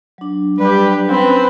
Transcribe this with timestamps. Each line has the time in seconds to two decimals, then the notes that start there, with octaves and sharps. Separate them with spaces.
0.18 F#3 D4
0.59 G3 G4 B4
1.09 C4 C#4 B4